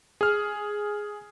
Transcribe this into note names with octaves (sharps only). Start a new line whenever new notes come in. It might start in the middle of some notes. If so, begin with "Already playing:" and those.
G#4 F6